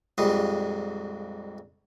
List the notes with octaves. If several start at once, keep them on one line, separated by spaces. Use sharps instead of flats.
A#1 F2 G3 G#3 D#6